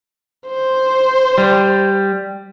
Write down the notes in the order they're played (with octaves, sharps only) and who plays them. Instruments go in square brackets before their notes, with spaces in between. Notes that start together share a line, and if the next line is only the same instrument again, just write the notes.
[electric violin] C5
[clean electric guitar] G3